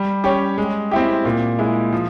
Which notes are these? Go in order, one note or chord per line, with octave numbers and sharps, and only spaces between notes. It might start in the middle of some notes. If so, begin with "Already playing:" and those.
Already playing: G3
C#4 G4 C#5
G#3
C4 E4 G4
A#2
G#3 E4
F3